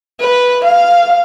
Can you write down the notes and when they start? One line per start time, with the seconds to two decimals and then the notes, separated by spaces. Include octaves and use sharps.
0.20 B4
0.65 F5